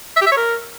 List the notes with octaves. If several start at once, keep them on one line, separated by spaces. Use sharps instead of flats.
E5
G4
E5
C#5
A#4